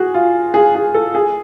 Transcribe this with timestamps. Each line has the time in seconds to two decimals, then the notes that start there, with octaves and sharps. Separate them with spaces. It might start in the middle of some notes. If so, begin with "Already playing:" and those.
Already playing: F#4 G#4
0.14 F4
0.54 G#4
0.75 G#4
0.94 A4
1.15 G#4